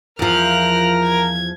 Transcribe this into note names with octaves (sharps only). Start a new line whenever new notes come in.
E2 F3 A#4 F6 F#6
G#6